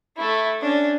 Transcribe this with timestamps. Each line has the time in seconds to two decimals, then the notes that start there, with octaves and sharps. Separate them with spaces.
0.16 A3 E4
0.61 C#4 D4